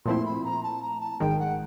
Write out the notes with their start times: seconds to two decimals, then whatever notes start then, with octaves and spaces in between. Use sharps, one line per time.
0.05 A#2 F3 A3 C4 E4 C6
0.25 B5
0.44 A#5
0.63 A5
0.82 A#5
1.01 A5
1.20 G#1 G#2 D#3 G#3 G5
1.39 F#5